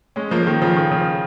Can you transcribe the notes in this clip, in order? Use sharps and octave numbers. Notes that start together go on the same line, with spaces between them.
G#3 C#4
F3 A#3
D#3
C#3 F3
D#3
C#3 F3